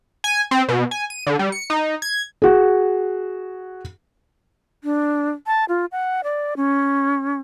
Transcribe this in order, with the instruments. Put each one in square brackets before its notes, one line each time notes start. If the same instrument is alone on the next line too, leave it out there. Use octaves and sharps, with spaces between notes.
[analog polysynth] G#5
C4
B2
G#5
D#7
D3
G3
C#7
D#4
G#6
[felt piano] F#4 G#4
[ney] D4
A5
F4
F#5
D5
C#4